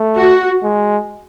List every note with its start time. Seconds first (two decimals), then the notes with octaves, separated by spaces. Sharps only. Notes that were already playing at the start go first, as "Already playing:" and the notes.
Already playing: A3
0.15 F#4
0.63 G#3